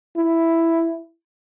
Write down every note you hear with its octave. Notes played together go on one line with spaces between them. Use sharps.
E4